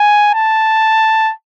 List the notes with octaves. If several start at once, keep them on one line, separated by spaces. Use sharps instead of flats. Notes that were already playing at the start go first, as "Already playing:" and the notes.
Already playing: G#5
A5